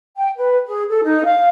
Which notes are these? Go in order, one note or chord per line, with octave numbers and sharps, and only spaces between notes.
G5
B4
G#4
A4
D#4
F5